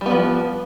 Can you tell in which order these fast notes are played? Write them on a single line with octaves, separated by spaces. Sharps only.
G3 B3 F3